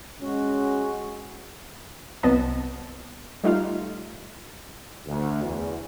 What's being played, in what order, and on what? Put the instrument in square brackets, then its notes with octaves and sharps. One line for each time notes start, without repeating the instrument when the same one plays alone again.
[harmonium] G#3 F#4 [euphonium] C#4
[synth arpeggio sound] C2 F#3 B3 C4 D#5 A5
G3 A3 D#4 F4 F5
[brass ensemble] D2
E2